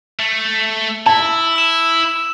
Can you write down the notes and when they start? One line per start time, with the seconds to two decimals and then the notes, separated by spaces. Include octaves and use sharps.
0.19 A3
1.06 E4 A5
1.56 E6 E7